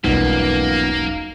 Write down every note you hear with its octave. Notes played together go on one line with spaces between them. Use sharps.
E1 B1 F#2 A#2 G3 A#3 B3 D#4